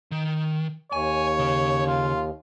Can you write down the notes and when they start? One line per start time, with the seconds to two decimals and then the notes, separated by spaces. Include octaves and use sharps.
0.12 D#3
0.93 D#2 C#5 G#5
1.39 C#3
1.87 F4